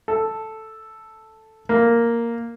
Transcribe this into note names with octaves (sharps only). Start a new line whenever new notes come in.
A4
A#3